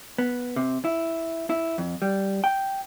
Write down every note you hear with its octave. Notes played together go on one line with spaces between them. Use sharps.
B3
C3
E4
E4
F2
G3
G5